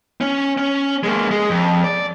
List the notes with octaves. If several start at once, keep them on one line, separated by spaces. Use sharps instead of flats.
C#4
C#4
G#3 A#3
G#3
F2
D5